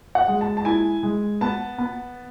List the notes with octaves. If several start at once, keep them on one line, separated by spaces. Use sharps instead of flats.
F#5
G#3
A5
A5
E4 G#5
G#3
B3 A5
B3